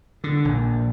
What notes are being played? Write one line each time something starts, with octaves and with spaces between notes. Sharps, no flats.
D3
A#1